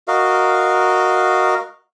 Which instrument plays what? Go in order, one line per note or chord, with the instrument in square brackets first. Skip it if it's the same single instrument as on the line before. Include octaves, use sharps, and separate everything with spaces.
[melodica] F#4 A#4 D#5 F5